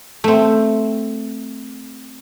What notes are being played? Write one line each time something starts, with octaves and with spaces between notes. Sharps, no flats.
A3 C4